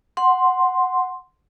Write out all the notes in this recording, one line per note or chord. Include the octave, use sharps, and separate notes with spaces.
F#5 C6